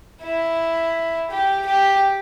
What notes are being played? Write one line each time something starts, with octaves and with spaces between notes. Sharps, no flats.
E4
G4
G4